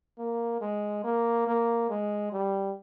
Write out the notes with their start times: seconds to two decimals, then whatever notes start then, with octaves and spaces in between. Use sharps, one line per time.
0.18 A#3
0.61 G#3
1.04 A#3
1.47 A#3
1.90 G#3
2.32 G3